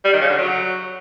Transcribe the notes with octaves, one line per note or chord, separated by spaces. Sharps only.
G3
D#3
C#3
D3
F#3